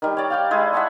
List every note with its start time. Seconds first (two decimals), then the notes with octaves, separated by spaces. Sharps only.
0.02 D#3 G3
0.17 C#5 D5
0.30 F5 G5 D6
0.51 G#3 E4 G#4
0.73 E5 F#5 A5 C#6